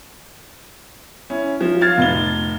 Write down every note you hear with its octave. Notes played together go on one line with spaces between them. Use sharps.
C#4 E4
F3
F5 F6 G#6 A6
F1 A6 G7